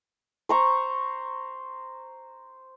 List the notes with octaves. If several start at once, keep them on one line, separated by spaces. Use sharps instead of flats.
C5 A#5 C#6